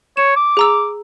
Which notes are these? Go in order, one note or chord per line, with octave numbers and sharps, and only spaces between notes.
C#5 E7
D6
G#4 A#5 E6